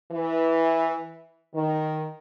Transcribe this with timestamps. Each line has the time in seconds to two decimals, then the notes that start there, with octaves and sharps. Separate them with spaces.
0.11 E3
1.54 D#3